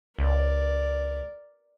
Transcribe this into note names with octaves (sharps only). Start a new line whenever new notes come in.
C#2 A#4 D5